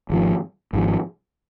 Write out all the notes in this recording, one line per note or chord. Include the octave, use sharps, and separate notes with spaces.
G#1 G#2 F3
G#1 G#2 F3